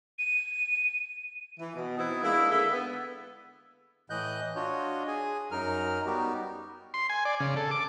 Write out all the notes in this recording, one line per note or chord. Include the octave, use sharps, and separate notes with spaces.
D#7
E3
B2
E3 B3 C4 D#4 E4
G#3 A#3 D4 E4
D3 G#4 A4 E5
B3
A2 E3 D#5 F#6 G6
D4 F4 F#4 C#5 D#5
G#4 G#5
F#2 F#3 D#4 A#4 F6
G3 B3 D#4 F#4 G4
C6
G#5
D5
C#3
A4
D6